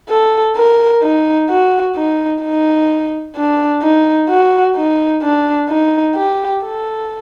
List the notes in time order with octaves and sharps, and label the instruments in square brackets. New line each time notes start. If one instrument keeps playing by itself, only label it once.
[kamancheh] A4
A#4
D#4
F#4
D#4
D#4
D4
D#4
F#4
D#4
D4
D#4
G4
A4